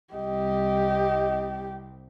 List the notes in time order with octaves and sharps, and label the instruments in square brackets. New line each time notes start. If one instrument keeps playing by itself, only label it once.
[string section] C2 [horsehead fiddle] G4 [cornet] D#5